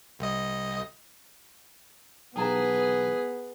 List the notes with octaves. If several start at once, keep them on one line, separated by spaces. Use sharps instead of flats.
C2 D#5
B1 E3 B3 G#4 B4 G5 A5 A#5